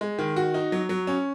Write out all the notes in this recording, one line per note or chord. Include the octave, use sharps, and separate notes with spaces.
G#3
D#3
F#4
D#4
F#3
F#3
C#4